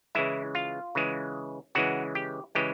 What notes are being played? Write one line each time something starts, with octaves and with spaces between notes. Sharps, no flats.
C#3 E3 G#3 E4 E5
F4 F5
C#3 E3 G#3
C#3 E3 G#3 F#4 F#5
G4 G5
C#3 E3 G#3 G4 G5